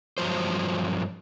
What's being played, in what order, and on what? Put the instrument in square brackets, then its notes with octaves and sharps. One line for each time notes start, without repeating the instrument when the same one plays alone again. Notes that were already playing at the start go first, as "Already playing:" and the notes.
[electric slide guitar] G2 F3 F#3 C5